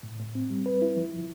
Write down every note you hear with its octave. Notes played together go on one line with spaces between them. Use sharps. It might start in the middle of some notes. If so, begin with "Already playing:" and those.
A2
A2
C4
G3
B4
E4
F3
F3